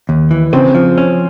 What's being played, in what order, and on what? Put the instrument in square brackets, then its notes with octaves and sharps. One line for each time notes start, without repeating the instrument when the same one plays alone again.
[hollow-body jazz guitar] D#2
E3
[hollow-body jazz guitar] C#3 [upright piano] C4
[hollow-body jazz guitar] F3
C#4